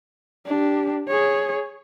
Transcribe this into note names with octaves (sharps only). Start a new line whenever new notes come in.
D4 G4
G#4 C#5